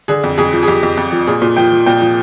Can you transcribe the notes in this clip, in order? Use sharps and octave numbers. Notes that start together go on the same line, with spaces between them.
D3 G#4
F2
F2 G#4
F3
G#4
F2 G4
F2
F2
F3
A#2 G#4
A#2
F3 G5
F3
A#2 G5
F3